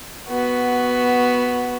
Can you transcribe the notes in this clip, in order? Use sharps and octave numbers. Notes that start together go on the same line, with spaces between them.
B3 F#4